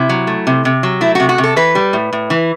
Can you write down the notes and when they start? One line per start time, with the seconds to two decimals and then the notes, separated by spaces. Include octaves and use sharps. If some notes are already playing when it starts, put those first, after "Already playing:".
Already playing: C3 E4
0.09 F#3
0.27 A3
0.47 C3
0.65 C3
0.83 F#3
1.01 A3 E4
1.15 C3 F#4
1.29 F#4
1.38 C3
1.44 A4
1.56 E3 B4
1.75 G3
1.93 A2
2.13 A2
2.30 E3